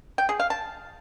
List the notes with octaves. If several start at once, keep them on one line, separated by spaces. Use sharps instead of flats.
G5
G#4
F5
A5